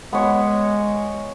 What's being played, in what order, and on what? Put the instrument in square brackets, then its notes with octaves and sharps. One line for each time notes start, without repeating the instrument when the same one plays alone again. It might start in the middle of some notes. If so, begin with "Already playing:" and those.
[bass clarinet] G#3 [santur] B3 C#5